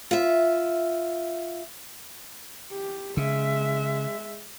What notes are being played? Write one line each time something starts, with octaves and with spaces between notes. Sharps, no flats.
F4 E5
G4
C#3 G#3 E5